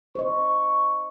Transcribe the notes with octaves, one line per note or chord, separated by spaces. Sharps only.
C5 D#5 C#6